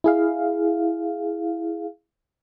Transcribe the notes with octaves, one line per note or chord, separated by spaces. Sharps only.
E4 G#4 F5